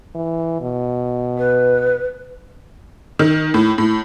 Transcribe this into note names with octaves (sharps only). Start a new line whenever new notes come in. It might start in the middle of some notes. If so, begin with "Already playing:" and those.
E3
B2
B4
D#3
A2
A2